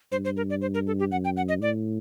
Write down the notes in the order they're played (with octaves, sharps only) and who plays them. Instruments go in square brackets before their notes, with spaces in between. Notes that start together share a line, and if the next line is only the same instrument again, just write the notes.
[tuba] G2 [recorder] C5
[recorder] C5
A#4
D5
C5
A#4
A4
G4
[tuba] F#2 [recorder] F#5
[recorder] G5
F#5
D#5
[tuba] A2 [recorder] D5